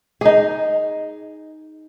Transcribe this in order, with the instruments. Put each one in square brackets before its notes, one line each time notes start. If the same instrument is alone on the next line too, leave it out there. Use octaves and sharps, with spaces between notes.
[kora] D#4 G#4